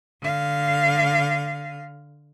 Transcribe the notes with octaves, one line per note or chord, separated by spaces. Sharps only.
D3 F5